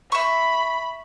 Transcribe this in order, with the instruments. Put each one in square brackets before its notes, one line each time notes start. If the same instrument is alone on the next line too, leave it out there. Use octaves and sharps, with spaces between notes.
[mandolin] E5 C#6 [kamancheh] B5